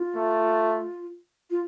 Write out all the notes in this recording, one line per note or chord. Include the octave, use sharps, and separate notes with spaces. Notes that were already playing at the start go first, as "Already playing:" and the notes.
Already playing: F4
A3
F4